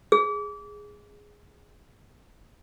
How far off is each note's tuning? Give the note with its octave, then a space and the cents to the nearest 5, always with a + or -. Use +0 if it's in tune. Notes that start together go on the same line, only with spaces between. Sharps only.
G#4 -5